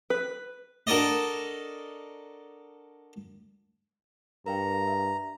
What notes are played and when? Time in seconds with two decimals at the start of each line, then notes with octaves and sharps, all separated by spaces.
0.10 B4
0.87 D4 F#4 A4 A#4 D5 D#5
4.46 G2 A#4 F5 G5 A#5
4.87 E5